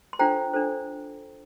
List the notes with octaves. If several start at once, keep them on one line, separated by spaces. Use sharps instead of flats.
C6
D4 F4 A4 C5 G5 A#5
D4 A4 C5